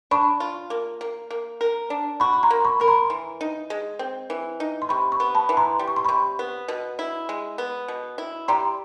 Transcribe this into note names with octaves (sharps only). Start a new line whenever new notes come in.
D4 B5 C#6
F4
A#3
A#3
A#3
A#4
D4
F#4 B5 C#6
C#6
A#5 C6
A#3
B5 C#6
A#4 B5
A#5 C6
E3
D#4
G#3
C4
E3
D#4
C6
C3 B5 C#6
B5 C#6
B3
A5 B5
E3
A#5 C6
G3
C#6
C6
C3 B5 C#6
B3
B2
E4
G#3
B3
B2
E4
G3 A#5 C6